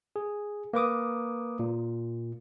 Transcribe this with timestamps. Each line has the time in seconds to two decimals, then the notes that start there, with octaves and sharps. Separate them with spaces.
0.16 G#4
0.73 A#3 B4 D6 D#6
1.59 A#2